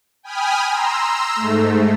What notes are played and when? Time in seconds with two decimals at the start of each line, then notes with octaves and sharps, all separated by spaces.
0.23 G5 G#5 B5 D#6 F6
0.68 A#5 C6 E6
1.36 G#2 A3